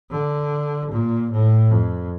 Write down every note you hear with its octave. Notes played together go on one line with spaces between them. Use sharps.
D3
A#2
A2
F2